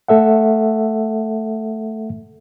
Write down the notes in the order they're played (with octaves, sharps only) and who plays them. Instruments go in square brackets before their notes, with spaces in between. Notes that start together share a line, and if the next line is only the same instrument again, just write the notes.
[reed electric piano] A3 A4 E5 F#5